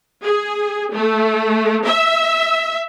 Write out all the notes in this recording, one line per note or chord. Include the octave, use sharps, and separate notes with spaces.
G#4
A3
E5